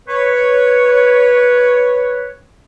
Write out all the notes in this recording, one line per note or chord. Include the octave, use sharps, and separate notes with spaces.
B4 C#5